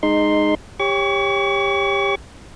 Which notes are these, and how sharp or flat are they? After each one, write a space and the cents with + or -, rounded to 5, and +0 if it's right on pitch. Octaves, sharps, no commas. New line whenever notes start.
G#3 +0 D#4 -15 C6 +5
G4 +20 C#5 -5 C#6 +40